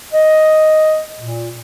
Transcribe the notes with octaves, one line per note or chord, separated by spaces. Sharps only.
D#5
A#2